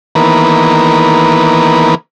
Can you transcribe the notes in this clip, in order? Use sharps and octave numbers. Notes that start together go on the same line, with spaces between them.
D#3 E3 A#3 B3 A#4 B4